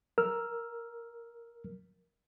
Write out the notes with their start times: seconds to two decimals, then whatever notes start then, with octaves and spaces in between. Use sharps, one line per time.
0.18 A#4 E6 F6